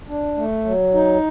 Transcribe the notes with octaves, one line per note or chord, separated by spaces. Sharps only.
D4
A3
F#3
D#4